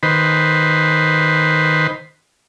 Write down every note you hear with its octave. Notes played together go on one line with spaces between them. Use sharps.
D#3 B4 C5